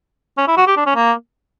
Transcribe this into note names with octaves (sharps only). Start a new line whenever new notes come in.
C#4
E4
F#4
G4
D4
C#4
A#3